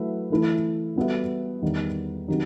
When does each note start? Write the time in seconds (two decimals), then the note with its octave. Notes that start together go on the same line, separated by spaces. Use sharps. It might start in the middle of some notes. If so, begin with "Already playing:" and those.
Already playing: F#3 A3 E4 B4 E5
0.30 E3 A3 E4
0.96 G3 B3 F#4 A4 E5
1.62 E2 D#3 G3 B3
2.28 D#3 F#3 C4 D#4 G4